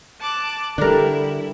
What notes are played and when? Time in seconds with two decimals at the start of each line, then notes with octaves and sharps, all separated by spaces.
0.19 A5 D6 F#6
0.78 D3 G3 D4 E4 A4 A#4